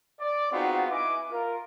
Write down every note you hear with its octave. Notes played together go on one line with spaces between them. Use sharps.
D5
G#3 B3 C4 D#4 F4 F#4
E4 B4 D#5 G#5 D6
F4 A#4